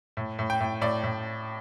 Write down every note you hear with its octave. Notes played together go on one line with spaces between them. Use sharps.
A2
A2
G5
A2
A2 D5
A2